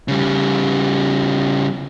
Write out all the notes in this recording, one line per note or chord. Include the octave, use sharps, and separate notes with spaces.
C#3 G3